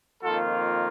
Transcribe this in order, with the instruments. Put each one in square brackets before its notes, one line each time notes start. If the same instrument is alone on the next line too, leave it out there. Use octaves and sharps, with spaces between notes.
[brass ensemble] F2 D#3 A#3 F4 A4